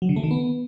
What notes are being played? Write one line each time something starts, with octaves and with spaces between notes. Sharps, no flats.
F#3
D3
A3
D#3
B3